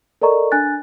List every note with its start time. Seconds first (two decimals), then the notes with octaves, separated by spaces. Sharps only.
0.22 A4 A#4 D5 D#5 A#5 C#6
0.52 D4 G#5 F#6 A6